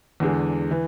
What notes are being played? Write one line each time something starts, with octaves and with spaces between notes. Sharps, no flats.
E2 D3 G#3
E3